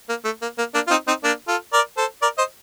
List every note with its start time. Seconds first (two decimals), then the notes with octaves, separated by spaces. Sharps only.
0.09 A#3
0.25 A3
0.42 A#3
0.58 A#3
0.74 A#3 D4
0.87 F4
0.91 C4 D#4
1.07 C4 D#4
1.24 A#3 D4
1.48 F4 A4
1.73 A#4 D5
1.97 A4 C5
2.22 A#4 D5
2.38 C5 D#5